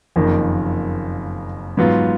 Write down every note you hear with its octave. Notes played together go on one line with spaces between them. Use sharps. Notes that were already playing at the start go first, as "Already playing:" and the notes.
F#1 F2 D#3 A#3
G#2 F#3 B3 F4